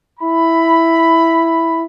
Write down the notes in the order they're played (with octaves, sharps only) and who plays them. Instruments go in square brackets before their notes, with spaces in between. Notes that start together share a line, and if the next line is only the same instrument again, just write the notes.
[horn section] E4 B5